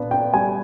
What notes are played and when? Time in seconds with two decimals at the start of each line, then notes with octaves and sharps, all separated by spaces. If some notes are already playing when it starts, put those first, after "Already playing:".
Already playing: A#2 B3 D4
0.11 D4 G5
0.34 G3 G#5